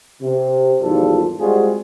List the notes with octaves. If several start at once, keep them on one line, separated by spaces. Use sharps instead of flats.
C3
G#1 E2 F3 G3 F4 A4
G3 G#3 C4 F4 F#4 G#4